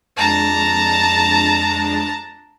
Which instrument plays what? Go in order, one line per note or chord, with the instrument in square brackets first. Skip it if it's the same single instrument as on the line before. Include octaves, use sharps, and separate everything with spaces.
[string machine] F2 G#3 D4 [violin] A5 A#5